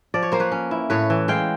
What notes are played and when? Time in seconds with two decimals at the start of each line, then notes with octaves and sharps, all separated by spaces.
0.14 F3 D5
0.22 C#5
0.32 A#3 C5
0.40 B4 C#5
0.52 C#4
0.71 E4
0.90 A2 B4 C#5
1.10 E3
1.28 G#3 F5 G5